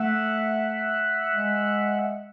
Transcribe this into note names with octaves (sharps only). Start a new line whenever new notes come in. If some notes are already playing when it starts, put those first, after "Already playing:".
Already playing: A3 E5 F#5
G#3